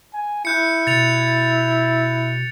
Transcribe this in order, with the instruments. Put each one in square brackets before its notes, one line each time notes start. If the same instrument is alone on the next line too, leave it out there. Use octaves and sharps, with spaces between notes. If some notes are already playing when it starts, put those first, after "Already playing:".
[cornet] G#5
[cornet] E4 [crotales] F#6 G6 C#7
[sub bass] B2 [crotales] A6 C#7 F7